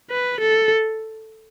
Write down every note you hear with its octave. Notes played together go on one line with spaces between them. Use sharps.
B4
A4